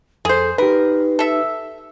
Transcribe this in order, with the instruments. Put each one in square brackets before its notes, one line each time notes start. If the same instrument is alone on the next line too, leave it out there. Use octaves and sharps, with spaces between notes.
[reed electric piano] F2 [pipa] G#4 C5 [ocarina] A4
[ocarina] D#4 [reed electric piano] G4 B4 [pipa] A#4
[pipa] A4 E5